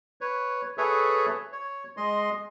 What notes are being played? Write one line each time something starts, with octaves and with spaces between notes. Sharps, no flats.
B4 C#5
G#4 A4 B4 C#5 E5
C#5
G#3 D#5 C6